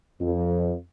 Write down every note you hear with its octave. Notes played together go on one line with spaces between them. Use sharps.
F2